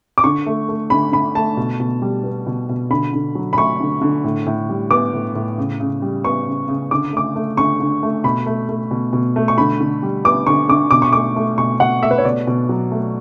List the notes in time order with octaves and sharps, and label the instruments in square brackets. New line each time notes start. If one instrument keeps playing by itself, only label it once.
[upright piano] D6
D3 C#6
A3
A3
D3 B5
D3 B5
A3 A5
B2
B2
G3
B3
B2
B2
D3 B5
D3
F#3
B5
A3 C#6
D3
D3
A2
A2
G3
B3 D6
A2
A2
C#3
C#3
G3
B3 C#6
C#3
C#3
D3 D6
A3 D6
A3
D3 C#6
D3
A3
B2 B5
A3
A3
B2
B2
A3
C#6
D3 B5
D3
G3
B3 D6
D3 C#6
D3 D6
B2 D6
C#6
A3 D6
A3
B2 C#6
B2 F#5
A3 E5
B4
C#5
B2 D5
B2
F#3
A3